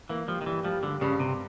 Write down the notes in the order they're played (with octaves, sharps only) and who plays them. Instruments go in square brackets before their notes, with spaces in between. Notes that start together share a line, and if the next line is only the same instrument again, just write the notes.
[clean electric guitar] E3 [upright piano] A#3
[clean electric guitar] F3 [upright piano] G3
[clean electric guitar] D#3
[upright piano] G2 [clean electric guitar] E3
[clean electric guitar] F3 [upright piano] G3
[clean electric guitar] D3 [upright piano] G3
[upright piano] G2 [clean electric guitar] C#3
[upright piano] G2 [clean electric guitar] C3